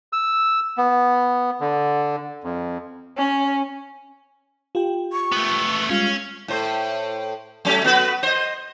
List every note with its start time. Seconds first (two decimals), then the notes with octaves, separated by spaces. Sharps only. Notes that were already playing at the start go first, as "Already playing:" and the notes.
0.13 E6
0.78 B3
1.61 D3
2.44 F2
3.18 C#4
4.75 F4 G4 G5
5.13 C#6
5.32 A3 B3
5.90 G3 G#3 C#4 F4 F5
6.48 A2 C5
7.65 F#3 A3 C#4
7.84 B3 F#4 B4
8.23 C5 D#5